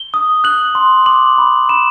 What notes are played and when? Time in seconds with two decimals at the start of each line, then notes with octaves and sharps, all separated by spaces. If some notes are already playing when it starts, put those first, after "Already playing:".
Already playing: G7
0.14 D#6
0.44 F#6 F#7
0.75 C6
1.06 D6 F#7
1.38 B5
1.69 B5 E7